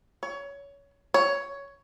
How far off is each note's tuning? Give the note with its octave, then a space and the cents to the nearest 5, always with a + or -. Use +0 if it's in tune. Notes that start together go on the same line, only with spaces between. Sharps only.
C#5 +20
C#5 +10